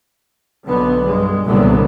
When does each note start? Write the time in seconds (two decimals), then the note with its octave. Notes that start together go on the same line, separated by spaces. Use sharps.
0.67 B1 D3 B3
1.06 G2 G#3
1.46 C2 A#2 D3 E3 F#3 B3